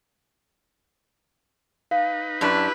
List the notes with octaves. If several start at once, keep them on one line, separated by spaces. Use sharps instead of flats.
D#4 B4 F5
F#2 D4 E4 G4 B4